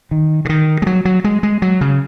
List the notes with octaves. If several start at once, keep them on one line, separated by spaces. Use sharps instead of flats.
D#3
C#3
D#3
G#3
F#3
F#3
G#3
G#3
F#3
C#3